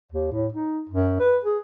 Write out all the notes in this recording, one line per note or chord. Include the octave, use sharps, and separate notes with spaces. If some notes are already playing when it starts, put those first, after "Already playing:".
D#2
A2
D#4
F#2
B4
G#4